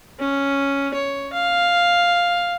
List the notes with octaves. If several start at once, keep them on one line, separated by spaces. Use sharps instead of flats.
C#4
C#5
F5